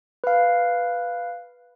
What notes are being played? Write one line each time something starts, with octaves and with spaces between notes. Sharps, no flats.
B4 F5